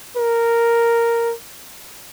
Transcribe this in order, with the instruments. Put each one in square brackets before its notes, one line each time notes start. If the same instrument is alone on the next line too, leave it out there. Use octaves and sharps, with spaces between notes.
[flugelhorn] A#4